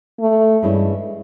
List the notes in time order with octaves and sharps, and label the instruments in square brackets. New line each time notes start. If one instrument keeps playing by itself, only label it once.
[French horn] A3
[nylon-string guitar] G2 E3 G#3 C#4 E4